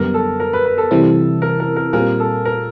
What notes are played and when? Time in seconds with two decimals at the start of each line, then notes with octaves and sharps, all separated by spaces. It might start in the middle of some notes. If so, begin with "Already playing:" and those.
Already playing: F#2 D3 G3 B3 A#4
0.14 A4
0.40 A#4
0.53 B4
0.65 B4
0.78 A4
0.91 C3 E3 G3 C4 E4
1.42 A#4
1.60 A#4
1.76 A#4
1.93 A#2 G3 C4 F4 G#4 A#4
2.20 A4
2.45 A#4